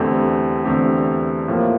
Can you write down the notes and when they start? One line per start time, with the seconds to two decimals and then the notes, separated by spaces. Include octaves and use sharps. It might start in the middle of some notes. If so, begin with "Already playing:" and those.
Already playing: E2 D3 A3 C4 G4
0.65 E2 D3 A3 C4 G4
1.48 A2 F3 A#3